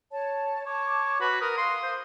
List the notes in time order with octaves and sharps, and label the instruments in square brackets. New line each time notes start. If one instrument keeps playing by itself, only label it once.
[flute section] C#5 A5
[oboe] C#5 [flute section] A5 D6
[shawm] F#4 [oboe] B4
[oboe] A#4 [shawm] D#6
[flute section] F5 [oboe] C6
[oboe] C5